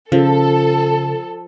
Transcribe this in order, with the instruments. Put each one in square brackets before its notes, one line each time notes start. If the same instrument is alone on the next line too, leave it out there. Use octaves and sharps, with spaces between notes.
[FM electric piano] C#3 [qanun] F3 [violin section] A4